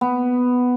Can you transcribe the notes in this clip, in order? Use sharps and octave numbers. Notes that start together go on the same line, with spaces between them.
B3